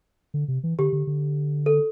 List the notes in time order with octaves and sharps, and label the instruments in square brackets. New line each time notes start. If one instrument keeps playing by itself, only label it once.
[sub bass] D3
C3
E3
[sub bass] D3 [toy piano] G4
[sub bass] D3
D3
[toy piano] A4